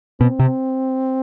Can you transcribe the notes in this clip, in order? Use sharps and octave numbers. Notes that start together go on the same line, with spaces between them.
B2 C4
C3